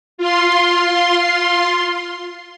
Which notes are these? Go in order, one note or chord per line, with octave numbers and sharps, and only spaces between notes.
F4 C6